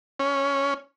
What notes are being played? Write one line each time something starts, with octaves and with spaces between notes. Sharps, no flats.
C#4